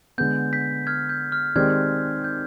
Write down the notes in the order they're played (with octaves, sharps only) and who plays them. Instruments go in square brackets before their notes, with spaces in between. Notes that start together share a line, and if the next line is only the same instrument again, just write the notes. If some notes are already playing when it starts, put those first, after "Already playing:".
[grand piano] D3 G#3 B3 [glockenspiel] G6
[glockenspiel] G6 B6
F6 G#6
G6
F6
[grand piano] D#3 G#3 C4 G4 D5 [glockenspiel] F6 G#6
[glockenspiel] G6